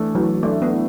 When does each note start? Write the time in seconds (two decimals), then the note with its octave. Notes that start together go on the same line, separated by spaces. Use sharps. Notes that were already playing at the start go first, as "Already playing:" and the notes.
Already playing: E3 A3 D4
0.15 E3 F#3
0.43 A3 D4
0.62 B3
0.71 E3